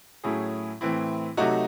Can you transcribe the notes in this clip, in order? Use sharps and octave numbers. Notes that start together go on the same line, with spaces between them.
A2 F#3 C#4 E4 G#4
A2 E3 C4 E4
C3 F#3 A3 D#4 F#4